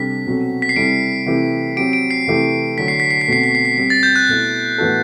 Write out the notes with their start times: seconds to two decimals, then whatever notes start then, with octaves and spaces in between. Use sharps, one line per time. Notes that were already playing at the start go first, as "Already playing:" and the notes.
Already playing: C3 G3 D4 A4 B6
0.26 B2 F#3 C4 F#4 A4
0.62 B6
0.69 C7
0.76 C3 G3 C4 E4 A4 D7
1.26 C3 E3 A3 E4 G4
1.77 F#3 C4 G4 D7
1.93 D7
2.11 C7
2.27 C3 E3 A3 E4 G4
2.78 D3 F#3 A3 B6
2.88 C7
3.00 B6
3.11 C7
3.21 B6
3.28 B2 A3 C4 F#4 C7
3.44 B6
3.55 C7
3.65 B6
3.77 G3 C4 G4 B6
3.90 A6
4.03 G6
4.16 F#6
4.29 B2 A3 E4
4.78 A2 E3 B3 F#4 A4